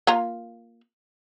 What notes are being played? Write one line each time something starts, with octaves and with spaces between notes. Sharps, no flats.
A#3 F4 A#5